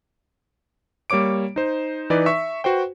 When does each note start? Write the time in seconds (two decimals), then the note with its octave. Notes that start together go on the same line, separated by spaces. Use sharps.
1.10 G3 A#3 C#5 D6 D7
1.56 D#4 C5
2.10 E3 D#4 B4 D5
2.26 E5 C#6
2.64 F#4 B4 C5 G5